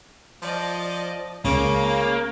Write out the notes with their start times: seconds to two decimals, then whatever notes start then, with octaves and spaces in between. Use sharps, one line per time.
0.42 F3 D5 D#5
1.45 C#2 C#3 A#3 D6